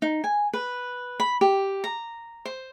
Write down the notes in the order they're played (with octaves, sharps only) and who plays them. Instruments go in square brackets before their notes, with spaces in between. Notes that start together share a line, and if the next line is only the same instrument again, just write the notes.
[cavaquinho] D#4
G#5
B4
B5
G4
A#5
C5